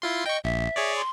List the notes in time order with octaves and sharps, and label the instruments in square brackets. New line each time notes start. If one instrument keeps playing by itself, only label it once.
[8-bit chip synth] E4 F4 C6
[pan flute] D#5 [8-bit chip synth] G5 C#6
[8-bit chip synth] A#1 [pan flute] E5
[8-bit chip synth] G#4 C#5 D5
[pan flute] C6